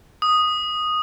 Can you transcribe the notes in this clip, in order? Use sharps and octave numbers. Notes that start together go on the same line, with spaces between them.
D#6